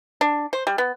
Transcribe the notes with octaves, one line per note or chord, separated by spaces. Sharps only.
D4
C5
G3
B3